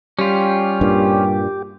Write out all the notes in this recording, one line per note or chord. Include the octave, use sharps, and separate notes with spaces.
G3 C#4 F4 G4
G2 A#2